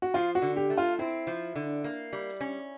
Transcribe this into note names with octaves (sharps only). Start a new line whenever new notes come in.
F#4
F3 F4
F#4
D3
G4
A3
F4
C4 E4
F3
D3
A#3
G3
C#4